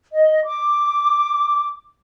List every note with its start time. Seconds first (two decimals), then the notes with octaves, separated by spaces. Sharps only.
0.13 D#5
0.45 D6